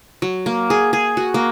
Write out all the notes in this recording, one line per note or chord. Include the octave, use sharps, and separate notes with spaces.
F#3
A#3
G#4
G#4
F#4
A#3